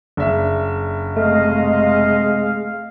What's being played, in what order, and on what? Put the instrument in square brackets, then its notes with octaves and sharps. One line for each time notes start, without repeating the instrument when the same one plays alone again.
[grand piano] F#1 E5 [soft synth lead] D4
[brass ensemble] C3 D#5 [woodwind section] G#3 F5 [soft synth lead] A3